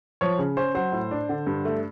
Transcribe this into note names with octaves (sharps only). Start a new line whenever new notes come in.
F3 C#5
C#3
C#4 C5
F#3 C5
A2
D4
D3
G2
A3